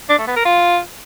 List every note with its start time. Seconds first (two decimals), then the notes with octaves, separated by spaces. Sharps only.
0.10 D4
0.19 A3
0.28 B3
0.36 A#4
0.45 F4